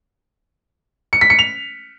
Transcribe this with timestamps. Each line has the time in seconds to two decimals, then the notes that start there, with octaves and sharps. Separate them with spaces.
1.13 C#7
1.21 B6
1.30 C#7
1.39 F7